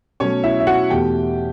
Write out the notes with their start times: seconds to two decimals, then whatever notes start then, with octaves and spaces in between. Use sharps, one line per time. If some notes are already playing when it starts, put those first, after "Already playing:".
0.20 B2 F#3 A3 C#4 C#5
0.44 E4 E5
0.60 E5
0.67 F#4 F#5
0.90 E2 B2 A3 G4 G5